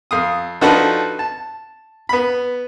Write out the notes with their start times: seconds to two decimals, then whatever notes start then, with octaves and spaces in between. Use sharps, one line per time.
0.11 F2 F5 D#6
0.61 F3 D4 D#4 F#4 A4 B4
1.19 A5
2.09 B3 B5